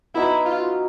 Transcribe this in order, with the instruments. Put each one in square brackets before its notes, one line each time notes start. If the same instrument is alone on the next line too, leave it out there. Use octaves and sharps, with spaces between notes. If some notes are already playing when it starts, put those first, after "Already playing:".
[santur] B3 D#4 F#4 [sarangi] E4
[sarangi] F4